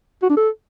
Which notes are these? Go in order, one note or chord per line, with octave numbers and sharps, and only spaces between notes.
F#4
D4
A4